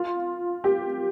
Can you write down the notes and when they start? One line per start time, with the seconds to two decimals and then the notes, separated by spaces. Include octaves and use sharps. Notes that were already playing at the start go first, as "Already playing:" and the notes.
Already playing: F4
0.64 G4